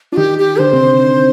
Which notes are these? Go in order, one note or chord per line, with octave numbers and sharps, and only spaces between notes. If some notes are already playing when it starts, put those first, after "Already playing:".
D4 F4
D#3 D#4 G4
G4
D3 D4 C5
C3 C4
D3